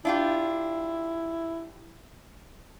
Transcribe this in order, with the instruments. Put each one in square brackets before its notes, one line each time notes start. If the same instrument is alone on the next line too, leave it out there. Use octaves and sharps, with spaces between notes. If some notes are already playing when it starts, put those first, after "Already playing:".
[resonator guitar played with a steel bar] D4 F4 G4 [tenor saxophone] E4